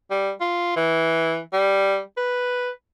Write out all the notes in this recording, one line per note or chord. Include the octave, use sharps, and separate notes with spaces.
G3
F4
E3
G3
B4